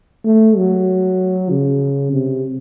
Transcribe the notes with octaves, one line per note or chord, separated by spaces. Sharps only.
A3
F#3
C#3
C3